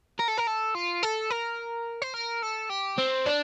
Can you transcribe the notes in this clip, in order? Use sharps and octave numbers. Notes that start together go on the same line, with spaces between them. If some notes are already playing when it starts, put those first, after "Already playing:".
A#4
A4
A#4
A4
F4
A4
A#4
C5
A#4
A4
G4
C4
D4